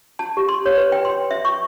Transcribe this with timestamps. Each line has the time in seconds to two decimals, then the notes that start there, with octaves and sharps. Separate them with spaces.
0.19 A5
0.37 G4
0.49 C6
0.66 C#5
0.77 B4
0.92 G5
1.05 C6
1.31 E5
1.45 C#6